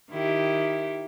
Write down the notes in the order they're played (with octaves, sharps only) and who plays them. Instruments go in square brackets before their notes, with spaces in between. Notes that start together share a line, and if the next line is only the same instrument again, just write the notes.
[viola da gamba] D#3 E4 G4